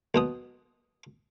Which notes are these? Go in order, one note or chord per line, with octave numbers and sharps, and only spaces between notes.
B1 B2 D#6